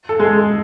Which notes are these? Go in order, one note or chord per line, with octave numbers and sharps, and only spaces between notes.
A4
G#3 G#4